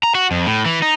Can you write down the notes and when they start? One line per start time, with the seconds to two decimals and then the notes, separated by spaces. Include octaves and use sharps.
0.03 A#5
0.15 F#4
0.31 F2
0.46 A2
0.66 E3
0.82 D#4